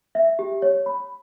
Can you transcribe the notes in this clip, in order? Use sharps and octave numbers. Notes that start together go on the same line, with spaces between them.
E5
G4
C#5
B5